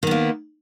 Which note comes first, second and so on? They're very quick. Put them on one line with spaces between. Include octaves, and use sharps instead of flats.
D#3 B3 A#3